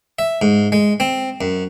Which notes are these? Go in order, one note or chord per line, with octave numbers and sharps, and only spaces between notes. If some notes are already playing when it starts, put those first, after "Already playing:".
E5
G#2
G#3
C4
F#2